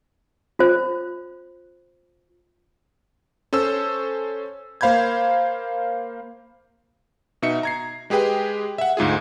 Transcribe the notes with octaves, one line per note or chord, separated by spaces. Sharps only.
F4 C5
C#4 A4 C5 E6
A#3 C5 F5 B5 G6 G#6
B2 D#4 E5 C#7
A#5 G#6 C7
G#3 G4 G#4 B4 G5
E5 F#5
D2 G#2 F4 G#4